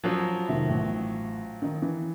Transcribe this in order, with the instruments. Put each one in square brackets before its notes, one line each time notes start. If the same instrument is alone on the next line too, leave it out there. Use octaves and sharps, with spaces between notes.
[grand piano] F3 F#3 [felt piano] C#4
[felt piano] F1 D#3 E5
A1
D#3 D#4
E3